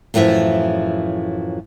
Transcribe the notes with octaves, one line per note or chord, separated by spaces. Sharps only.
F#2 A2 E3 F3 E5